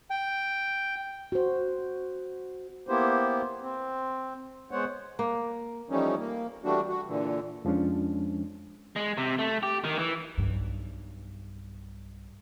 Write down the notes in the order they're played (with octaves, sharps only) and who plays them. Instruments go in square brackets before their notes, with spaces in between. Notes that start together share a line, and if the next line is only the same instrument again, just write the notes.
[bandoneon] G5
[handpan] F#4 C5
[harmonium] A#3 B3 E4 G4 C5
C4
G#3 B3 C5 C#5 F#5
[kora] A#3
[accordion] E3 F3 G3 A3 C#4 D#4
A#3
E3 G3 A3 D4 F#4
F#4
A#2 D3 E3
[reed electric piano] F2 F3 G#3 C#4 D4
[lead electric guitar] G#3
C3
A3
G4
D#3
E3
[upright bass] B1 G2